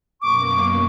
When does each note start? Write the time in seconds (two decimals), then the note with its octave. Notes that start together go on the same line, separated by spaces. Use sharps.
0.22 F#2 B2 A#3 C#6 D6